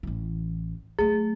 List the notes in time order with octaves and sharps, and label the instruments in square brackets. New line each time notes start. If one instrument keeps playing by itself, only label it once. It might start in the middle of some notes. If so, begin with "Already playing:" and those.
[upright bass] A1 E3
[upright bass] F#3 A3 [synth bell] G#4